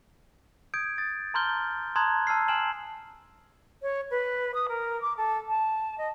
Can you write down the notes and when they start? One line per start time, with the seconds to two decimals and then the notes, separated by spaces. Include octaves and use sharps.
0.74 D#6 G6 G#6 D7
0.98 D#6 A6
1.34 A5 A#5 C6 F6 G6 G7
1.95 A5 A#5 C6 D#6 F#6 G#6
2.27 A5 E6 F6 C7
2.48 G#5 F6 E7 F#7
3.82 C#5
4.10 B4
4.54 D#6
4.68 A#4
5.01 D6
5.17 A4
5.48 A5
5.98 D#5